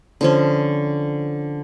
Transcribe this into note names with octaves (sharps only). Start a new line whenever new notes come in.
D3 F3 C#4